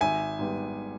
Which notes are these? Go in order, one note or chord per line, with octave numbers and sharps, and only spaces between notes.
G#1 E5 G#5
G#2 G3 B3